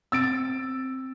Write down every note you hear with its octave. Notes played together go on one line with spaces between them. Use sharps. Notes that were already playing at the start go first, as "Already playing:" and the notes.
C4 E6 A6 D7